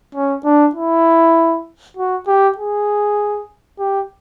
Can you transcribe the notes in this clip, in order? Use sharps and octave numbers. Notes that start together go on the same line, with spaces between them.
C#4
D4
E4
F#4
G4
G#4
G4